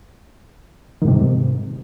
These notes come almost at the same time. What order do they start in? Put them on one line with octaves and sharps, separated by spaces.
D#3 G#2 C3